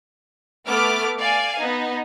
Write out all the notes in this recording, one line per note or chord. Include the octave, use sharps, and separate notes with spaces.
A3 B3 D6 F6
D5 F5 G#5
B3 D#4